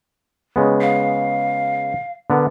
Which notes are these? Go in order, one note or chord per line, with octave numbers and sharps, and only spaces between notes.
C#3 G#3 B3
F5
D3 B3 A#4